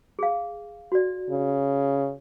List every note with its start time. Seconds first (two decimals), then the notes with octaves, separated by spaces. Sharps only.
0.19 G#4 F5
0.92 F#4 D5
1.30 C#3